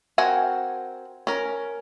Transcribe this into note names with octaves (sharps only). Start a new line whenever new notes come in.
C4 F#4 A#4 F#5 G#5
C#4 A#4